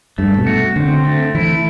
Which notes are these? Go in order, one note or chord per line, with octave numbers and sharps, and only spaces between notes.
G2 A3
B2
F#4
D3 C4
A3
E3 E4